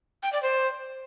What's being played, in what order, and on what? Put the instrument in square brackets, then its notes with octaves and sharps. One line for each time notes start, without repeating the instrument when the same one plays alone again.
[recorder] G5
D5
C5